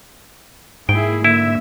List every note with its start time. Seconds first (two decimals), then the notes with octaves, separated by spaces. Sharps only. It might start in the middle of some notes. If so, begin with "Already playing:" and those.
0.89 G#2 A#3 E4 G#4 G5
1.24 D3 A#3 E4 E5